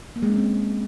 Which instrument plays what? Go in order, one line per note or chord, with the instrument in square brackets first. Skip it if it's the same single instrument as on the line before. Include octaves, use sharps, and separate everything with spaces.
[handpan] A#3
G#3
C#4
C4